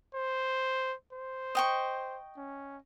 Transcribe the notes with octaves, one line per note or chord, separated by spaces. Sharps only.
C5
C5
D#5 G5 C#6
C#4